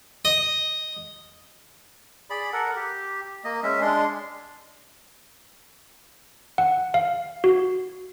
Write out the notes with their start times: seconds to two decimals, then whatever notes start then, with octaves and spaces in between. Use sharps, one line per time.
0.25 D#5
2.30 G#4 D5 B5
2.53 A4 A#4 F#5
2.76 G4
3.44 A#3 D#5
3.63 G#3 C#4 E5
3.81 G#3 D4 C6
6.58 F#5
6.94 F5
7.44 F#4